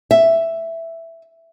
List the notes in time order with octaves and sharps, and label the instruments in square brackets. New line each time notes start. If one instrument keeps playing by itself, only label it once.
[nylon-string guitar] E5